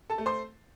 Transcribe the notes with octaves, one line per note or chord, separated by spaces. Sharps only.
A4 A5
A3
C5 C6